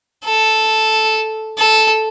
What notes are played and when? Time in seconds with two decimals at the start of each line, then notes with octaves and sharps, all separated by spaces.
0.25 A4
1.58 A4